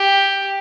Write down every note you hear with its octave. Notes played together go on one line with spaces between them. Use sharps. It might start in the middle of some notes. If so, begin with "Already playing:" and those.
Already playing: G4